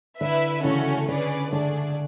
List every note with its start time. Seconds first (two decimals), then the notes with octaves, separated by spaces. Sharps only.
0.20 D3 E4 B4 E5
0.64 C#3 E3 A3 C#4 F#4 A4
1.08 D3 C#4 G#4 B4 D5
1.52 D3 A3 D4 G#4 D5